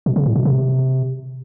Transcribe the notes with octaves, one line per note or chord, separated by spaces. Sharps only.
B2
C#3
A2
B2
C3